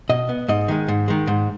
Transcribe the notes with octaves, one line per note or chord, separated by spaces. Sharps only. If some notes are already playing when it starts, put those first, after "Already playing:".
B2 D#5
B3
G#2 D#5
D#3 G#3
G#2
D#3 G#3
G#2